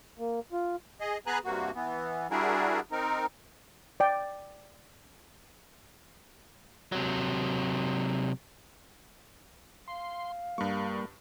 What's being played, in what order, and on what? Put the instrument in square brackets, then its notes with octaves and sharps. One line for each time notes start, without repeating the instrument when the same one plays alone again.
[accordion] A#3
F4
G#4 D#5
B3 G#4 B4 G#5 A#5 F#6
G2 C3 A#3 F#4
E3 B3
G3 D4 E4 F#4 G#4 A#4
C4 D#4 A#4
[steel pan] D5 G5
[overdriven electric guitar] C3 F#3
[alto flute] F5 [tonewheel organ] C6
[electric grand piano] G2 C#6 [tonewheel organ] G3 A#3